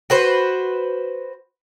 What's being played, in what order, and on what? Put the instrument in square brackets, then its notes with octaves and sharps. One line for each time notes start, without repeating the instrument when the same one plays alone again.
[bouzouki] F#4 B4 C5